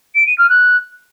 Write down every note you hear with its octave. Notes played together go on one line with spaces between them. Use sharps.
D7
D#7
F6
F#6